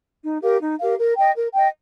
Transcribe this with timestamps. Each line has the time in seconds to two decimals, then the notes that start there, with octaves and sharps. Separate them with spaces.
0.24 D#4
0.42 G4 A#4 F5
0.61 D#4
0.79 G4 A#4 F5
0.98 A#4
1.16 D#5 G5
1.35 A#4
1.53 D#5 G5